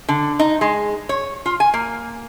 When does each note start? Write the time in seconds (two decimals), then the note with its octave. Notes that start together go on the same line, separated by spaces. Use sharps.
0.09 D3
0.39 D#4
0.61 G#3
1.09 C#5
1.46 F4
1.60 G#5
1.74 A#3